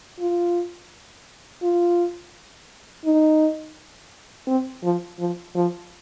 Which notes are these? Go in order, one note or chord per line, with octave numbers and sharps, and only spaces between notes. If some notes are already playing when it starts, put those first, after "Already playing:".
F4
F4
D#4
C4
F3
F3
F3